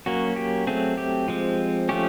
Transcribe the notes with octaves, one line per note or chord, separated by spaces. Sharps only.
F#3 A#3 C#4 F#4
G4
F#3 A3 C4 G#4
G4
F3 G#3 C4
F3 A3 C#4 G4